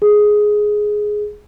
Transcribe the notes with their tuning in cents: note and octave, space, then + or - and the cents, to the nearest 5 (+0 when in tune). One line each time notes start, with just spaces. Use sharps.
G#4 +5